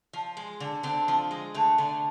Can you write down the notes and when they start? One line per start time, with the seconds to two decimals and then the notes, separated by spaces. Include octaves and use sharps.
0.13 F3
0.37 G#3
0.60 D3
0.83 D3 C4
1.08 F3
1.31 G#3
1.54 D3 A3
1.78 D3